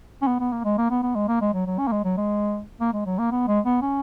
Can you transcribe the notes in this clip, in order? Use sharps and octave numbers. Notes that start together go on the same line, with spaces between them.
C#4
B3
B3
A#3
G#3
A#3
B3
B3
G#3
A#3
G#3
F#3
F#3
C#4
A#3
G#3
F#3
G#3
A#3
G#3
F#3
A#3
B3
G#3
B3
C#4